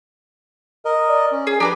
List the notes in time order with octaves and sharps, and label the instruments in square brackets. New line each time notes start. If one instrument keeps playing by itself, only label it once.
[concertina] A#4 D#5
[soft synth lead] D5
[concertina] C#4
[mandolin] G#4
[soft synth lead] F3 [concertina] D4 A#5 [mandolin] G4 G#4 B4